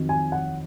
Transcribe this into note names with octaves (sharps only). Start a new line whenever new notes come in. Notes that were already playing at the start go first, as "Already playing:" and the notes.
Already playing: F2 D#3 F#3
G#5
F#5